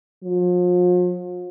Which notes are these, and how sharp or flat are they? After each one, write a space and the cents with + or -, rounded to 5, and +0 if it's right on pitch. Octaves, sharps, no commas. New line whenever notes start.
F3 +40